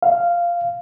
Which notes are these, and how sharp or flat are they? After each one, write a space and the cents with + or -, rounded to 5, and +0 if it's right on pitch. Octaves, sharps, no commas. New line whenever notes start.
F5 -10